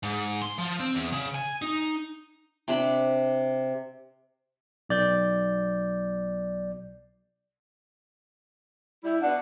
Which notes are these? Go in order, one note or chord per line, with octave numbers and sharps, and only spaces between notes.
G#2
C6
F3
C4
E2
C#3
G#5
D#4
C3 D4 B5
B1 D5 G6
G3 E4
B2 D4 F#5